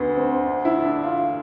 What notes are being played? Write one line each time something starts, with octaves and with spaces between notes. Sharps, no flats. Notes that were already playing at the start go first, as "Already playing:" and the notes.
Already playing: D2 B3
C4
D4
E4
D4
F4